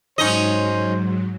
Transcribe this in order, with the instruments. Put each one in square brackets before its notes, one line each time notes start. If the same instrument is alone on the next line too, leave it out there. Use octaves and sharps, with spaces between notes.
[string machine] G#2 F#3 [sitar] C#4 D#4 D#5 [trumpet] C5